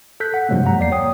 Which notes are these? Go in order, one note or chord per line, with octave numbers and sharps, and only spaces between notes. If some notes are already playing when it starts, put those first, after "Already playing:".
A4 F#6 G6 B6
F#5
G2 C3 F3 F#3 G#3 A#3
F#5 A#5
E2 A#3 D5 C7
C#5 G5 D#6